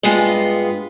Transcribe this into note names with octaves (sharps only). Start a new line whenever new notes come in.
G2 G#3 B3 F4 D#5